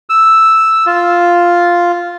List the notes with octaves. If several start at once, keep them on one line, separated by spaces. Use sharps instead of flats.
E6
F4